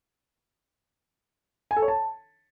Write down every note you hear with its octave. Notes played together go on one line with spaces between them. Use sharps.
G#5
A4
C#5
A5